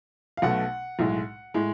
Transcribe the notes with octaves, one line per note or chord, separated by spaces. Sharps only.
F5
B1 B2 A3 F#5
B1 A2 G#3
A2 G#3